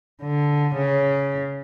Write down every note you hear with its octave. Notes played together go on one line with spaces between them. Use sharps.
D3
C#3